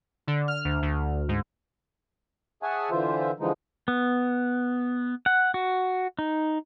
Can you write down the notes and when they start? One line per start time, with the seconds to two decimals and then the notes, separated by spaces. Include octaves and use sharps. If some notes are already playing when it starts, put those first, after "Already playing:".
0.27 D3
0.48 F6
0.65 D2
0.82 D2
1.29 G#2
2.63 G#4 C#5 E5 F#5 G#5 A5
2.91 D3 E3 F4 C5 E5
3.40 D3 E3 F3 G#3 D#4
3.88 B3
5.26 F#5
5.54 F#4
6.19 D#4